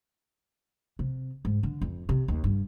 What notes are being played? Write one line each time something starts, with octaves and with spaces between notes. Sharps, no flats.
C3
G#2
D3
F2
C3
D#2
G2